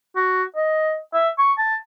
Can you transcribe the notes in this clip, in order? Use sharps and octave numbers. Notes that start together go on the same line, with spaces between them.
F#4
D#5
E5
C#6
A5